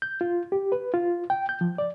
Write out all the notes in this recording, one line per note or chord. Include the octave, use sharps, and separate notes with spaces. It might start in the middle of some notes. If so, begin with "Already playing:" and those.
G6
F4
G4
B4
F4
G5
G6
F3
D5